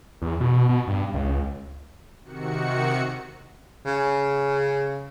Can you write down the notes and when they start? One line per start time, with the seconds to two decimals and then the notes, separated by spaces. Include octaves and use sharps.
0.22 E2
0.40 B2
0.69 B2
0.87 G2
1.14 C#2
2.23 C3 D#3 F#4 C#7
3.86 C#3